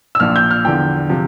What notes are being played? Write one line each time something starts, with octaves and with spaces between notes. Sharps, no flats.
E6
A#1 A#2 F3 F6
G6
F6
E2 D3 F3 G5
C3 F3